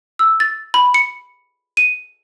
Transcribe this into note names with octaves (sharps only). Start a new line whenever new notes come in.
E6
A6
B5
C#7
D#7